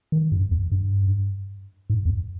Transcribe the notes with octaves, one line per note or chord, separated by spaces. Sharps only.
D#3
G2
E2
G2
G#2
E2